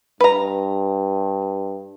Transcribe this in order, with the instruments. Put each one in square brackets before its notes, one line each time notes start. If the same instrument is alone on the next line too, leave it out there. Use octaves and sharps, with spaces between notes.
[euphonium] G2 [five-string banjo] B4 A#5